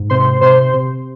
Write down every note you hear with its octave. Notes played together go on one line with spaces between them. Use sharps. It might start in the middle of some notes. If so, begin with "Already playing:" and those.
Already playing: G#2
C3 C5 C6
C3 C5 C6
C3